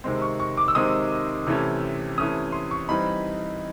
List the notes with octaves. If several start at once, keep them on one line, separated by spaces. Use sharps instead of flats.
C3 D#3 G#3 C4
C#6
C#6
D6
E6
C3 D#3 G#3 C4 D#6
C3 E3 A3 C#4
C3 E3 A3 C#4 D#6
C6
C#6
E3 G3 C4 D#4 B5